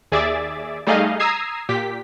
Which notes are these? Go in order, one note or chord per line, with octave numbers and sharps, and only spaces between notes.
D#2 G#4 D5 E5 D6 A6
G3 A3 D#4 G#4 D#5 F5
A#5 D#6 E6 G#6 C7
A#2 G4 B6